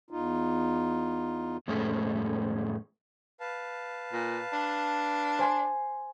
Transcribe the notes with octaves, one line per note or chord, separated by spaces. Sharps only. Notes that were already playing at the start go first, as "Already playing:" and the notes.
E2 D#4 F4
F2 A2 G#3 A3 C#4
B4 F5 A5
A#2
D4
C5 G#5 C6